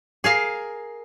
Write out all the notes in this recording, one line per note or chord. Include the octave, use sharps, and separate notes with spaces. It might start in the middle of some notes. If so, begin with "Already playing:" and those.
G#4 A#4 F5